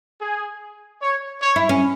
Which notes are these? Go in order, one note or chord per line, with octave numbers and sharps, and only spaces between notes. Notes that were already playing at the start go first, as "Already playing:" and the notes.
G#4
C#5
C#5
E4
C#4